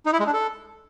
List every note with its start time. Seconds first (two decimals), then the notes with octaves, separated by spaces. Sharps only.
0.06 D#4
0.13 E4
0.20 G#3
0.27 D4
0.34 A4